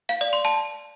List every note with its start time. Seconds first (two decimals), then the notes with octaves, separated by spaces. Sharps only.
0.09 F5
0.21 D5
0.33 C6
0.45 A5